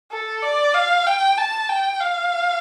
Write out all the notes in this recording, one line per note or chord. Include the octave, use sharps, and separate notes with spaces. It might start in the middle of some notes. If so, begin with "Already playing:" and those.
A4
D5
F5
G5
A5
G5
F5